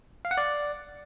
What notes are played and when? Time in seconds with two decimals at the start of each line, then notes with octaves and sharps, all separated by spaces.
0.25 F5
0.31 F#5
0.37 D5